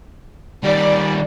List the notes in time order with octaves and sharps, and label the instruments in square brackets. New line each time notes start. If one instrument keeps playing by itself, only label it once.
[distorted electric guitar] D#3 G3 [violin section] D5